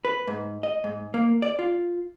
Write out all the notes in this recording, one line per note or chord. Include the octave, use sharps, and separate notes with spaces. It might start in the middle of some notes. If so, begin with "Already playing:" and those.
B4
G#2
D#5
G#2
A#3
D5
F4